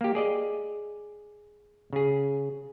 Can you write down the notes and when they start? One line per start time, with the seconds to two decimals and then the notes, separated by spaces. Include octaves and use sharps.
0.01 A#3 G4
0.15 G#4 D5 D#5
1.93 C#3 G#4